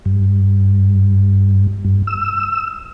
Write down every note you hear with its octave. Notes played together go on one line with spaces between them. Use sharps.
G2
G2
E6